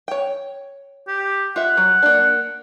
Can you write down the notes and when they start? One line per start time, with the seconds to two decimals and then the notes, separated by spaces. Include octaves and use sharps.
0.08 C#5 G5
1.07 G4
1.56 F4 E5 F#5
1.77 F#3
2.02 A#3 D4